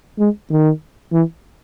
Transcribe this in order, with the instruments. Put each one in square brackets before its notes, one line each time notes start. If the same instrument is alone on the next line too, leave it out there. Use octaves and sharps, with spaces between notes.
[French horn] G#3
D#3
E3